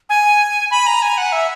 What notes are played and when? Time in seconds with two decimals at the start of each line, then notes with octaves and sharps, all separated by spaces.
0.09 G#5
0.71 B5
0.87 A#5
1.02 G#5
1.18 F#5
1.32 E5